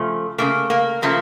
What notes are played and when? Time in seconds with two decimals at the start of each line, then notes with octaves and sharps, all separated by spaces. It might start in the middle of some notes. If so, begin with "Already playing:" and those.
Already playing: C#3 F3 A3
0.38 C#3 F3 A3 A#3
0.70 A#3
1.02 C#3 F3 A3 A#3